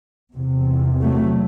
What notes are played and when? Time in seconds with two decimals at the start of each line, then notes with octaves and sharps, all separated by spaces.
0.34 E2 C3
1.01 F#3 A3